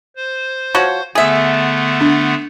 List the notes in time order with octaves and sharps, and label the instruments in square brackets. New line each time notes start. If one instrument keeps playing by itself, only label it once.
[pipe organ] C5
[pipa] F3 F#4 C#5
[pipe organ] D3 A3 B3 [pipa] G#4 E5
[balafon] D4